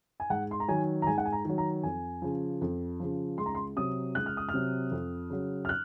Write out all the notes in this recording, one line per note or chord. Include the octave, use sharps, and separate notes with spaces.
G#5
G#2 F#5
C6
A#5
D#3 F#3 G#5
A#5
G#2 G#5
F#5
G#5
A#5
D#3 F#3
A#5
F2 G#5
C#3 F3
F2
C#3 F3
C#2 C6
A#5
C6
C3 F#3 D#6
C#2 F#6
F6
D#6
F6
C3 F#3
F2
C#3 F#3
F6
F#6